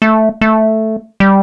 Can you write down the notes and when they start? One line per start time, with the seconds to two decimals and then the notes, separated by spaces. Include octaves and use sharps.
0.02 A3
0.41 A3
1.20 G3